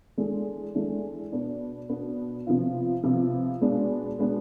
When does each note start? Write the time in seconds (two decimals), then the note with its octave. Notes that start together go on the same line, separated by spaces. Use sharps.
0.17 E3 G#3 D4 A4
0.75 E3 G#3 D4 A4
1.32 B2 B3 D4
1.89 B2 B3 D4
2.47 C3 F3 B3 F4
3.04 C3 F3 B3 F4
3.61 B2 G#3 B3 D4
4.19 B2 G#3 B3 D4